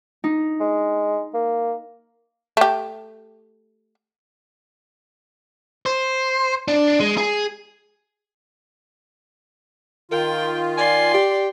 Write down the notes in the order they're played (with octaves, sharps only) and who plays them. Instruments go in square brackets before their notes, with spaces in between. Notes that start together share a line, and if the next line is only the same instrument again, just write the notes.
[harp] D#4
[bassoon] G#3
A#3
[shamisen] A3 G4
[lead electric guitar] C5
D4
G#3
G#4
[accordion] D#3 F4 [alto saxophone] A#4 [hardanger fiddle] G5
[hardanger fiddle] D5 C6 [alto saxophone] G#5
[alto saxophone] G4